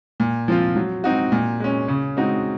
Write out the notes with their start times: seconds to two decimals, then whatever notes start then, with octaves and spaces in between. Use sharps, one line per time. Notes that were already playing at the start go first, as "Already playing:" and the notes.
0.20 A#2
0.48 F3 C4 F4
0.76 F#3
1.04 C4 D#4 F#4
1.32 A#2
1.60 G#3 C#4
1.88 C#3
2.16 G#3 C4 D#4 F#4